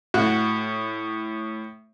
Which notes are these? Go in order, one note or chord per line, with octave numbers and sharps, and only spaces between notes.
A2 F#4